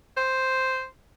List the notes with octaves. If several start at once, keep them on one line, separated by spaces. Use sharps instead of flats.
C5